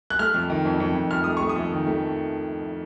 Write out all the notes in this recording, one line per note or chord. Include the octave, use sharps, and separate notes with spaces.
F#6
A3 F6
F2
D#3
F2
F2
F2
F2 F6
A3 D#6
A3 C#6
D#6
F2
D#3
A3